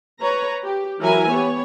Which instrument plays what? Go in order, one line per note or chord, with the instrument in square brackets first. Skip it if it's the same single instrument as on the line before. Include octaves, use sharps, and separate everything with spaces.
[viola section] B4 C#5 A#5
G4
E3 F#3 E4 A#4 E5 G#5
B3 G4 C#5